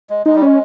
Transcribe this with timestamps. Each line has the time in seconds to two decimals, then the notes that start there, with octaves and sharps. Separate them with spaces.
0.10 G#3
0.26 G#3 D#4
0.36 G3
0.42 G#3 C#4